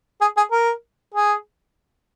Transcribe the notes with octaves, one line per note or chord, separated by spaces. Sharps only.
G#4
G#4
A#4
G#4